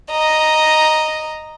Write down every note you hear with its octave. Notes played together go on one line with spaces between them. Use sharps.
D#5 A#5